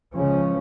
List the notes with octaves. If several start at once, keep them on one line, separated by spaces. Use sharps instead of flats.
C#2 C#3 F3 C#4